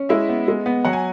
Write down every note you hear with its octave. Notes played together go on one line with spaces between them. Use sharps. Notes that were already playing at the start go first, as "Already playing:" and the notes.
Already playing: C#4
G#3 E4 E5
B3
G#3
B3
F#3 F#5
G#5